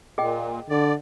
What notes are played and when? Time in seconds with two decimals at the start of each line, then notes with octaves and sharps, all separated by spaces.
0.18 A#2 G#4 D#5 G5
0.70 D3 D5